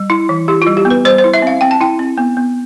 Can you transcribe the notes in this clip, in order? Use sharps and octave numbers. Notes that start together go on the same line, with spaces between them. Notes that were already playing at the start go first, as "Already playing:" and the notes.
Already playing: G3
E4
E3
E4 G4
F4
G3
G4
B3
B4
G3 C5
C5
E4
E5
C4 F5
C4 G5
A5
E4 G5
C4
B3
B3